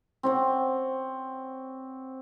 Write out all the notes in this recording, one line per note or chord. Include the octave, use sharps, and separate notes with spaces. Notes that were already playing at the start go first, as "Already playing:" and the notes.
C4 C#5 F#5